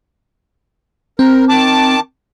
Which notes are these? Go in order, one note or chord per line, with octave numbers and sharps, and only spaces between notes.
C4 A#4
D#3 A5 D6